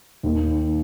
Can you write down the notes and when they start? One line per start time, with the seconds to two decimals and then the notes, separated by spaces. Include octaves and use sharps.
0.23 D#2 D#3 A#3